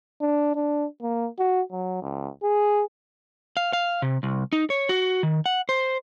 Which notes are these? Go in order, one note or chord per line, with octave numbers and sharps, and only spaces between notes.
D4
D4
A#3
F#4
F#3
C#2
G#4
F5
F5
C3
C2
D#4
C#5
F#4
D#3
F#5
C5